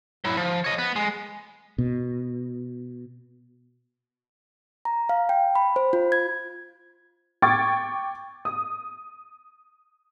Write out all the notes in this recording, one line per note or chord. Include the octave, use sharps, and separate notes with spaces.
F#3 E4
F3
C#5 D#5
B3
G#3
B2
A#5
F5
G5
B5
C5
F4
G#6
G5 C#6 D6 G#6 A6
D#6